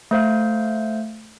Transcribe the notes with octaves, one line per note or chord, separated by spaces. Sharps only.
A3 C5 F5